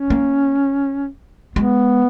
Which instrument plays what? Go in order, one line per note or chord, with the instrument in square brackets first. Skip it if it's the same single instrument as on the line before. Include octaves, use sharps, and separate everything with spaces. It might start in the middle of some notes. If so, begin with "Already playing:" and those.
Already playing: [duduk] C#4
[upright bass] A#3
[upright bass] G#3 [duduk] B3